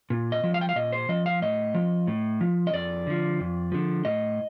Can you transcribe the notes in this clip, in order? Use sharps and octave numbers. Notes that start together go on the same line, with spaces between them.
A#2
D#5
F3
F5
G5
F5
A#2 D#5
C5
F3 D#5
F5
A2 D#5
F3
A2
F3
D#5
F2 D5
D3 F3
F2
D3 F3
A2 D#5